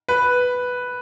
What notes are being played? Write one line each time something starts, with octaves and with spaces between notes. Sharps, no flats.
B4